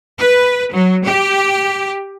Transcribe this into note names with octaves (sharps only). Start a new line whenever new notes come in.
B4
F#3
G4